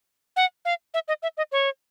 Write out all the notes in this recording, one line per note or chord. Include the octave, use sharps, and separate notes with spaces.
F#5
F5
E5
D#5
E5
D#5
C#5